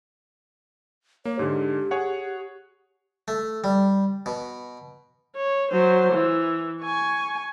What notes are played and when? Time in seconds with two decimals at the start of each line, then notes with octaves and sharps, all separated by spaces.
1.25 A#3 C#5
1.39 G#2 D3 G4
1.91 G#4 C#5 F#5
3.28 A3
3.64 G3
4.26 B2
5.36 C#5
5.72 F#3 C5
6.13 E3
6.82 G#5 C#6